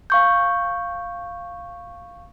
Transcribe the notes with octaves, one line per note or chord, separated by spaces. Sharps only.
F5 C#6 G6